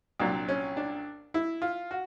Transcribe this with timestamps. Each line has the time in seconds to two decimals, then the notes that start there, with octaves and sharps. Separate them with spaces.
0.20 C2 A#2 F#3 D4
0.49 C#4
0.77 D4
1.34 E4
1.62 F4
1.91 F#4